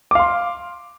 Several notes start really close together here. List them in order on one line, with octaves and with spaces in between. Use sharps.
D6 F5 C6